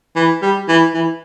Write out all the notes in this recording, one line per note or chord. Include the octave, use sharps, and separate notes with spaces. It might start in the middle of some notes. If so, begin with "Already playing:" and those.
E3
G3
E3
E3